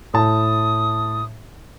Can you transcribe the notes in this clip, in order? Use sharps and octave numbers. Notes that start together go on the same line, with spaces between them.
A2 A5 D#6